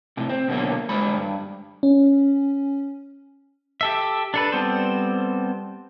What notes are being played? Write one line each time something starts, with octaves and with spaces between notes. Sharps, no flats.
A2 C3
C4
B2 D3 F#3 A#3
D3 G#3 C5 B5
G2
C#4
G4 A4 E5
D4 A4 B4
G3 B3 C4 A4 C5